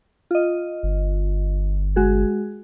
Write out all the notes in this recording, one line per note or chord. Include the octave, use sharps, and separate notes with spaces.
F4 D#5
G1
G#3 F#4 G#4